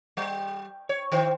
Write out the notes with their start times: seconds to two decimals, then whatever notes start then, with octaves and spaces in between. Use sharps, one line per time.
0.17 G3
0.89 C#5
1.12 D#3 C5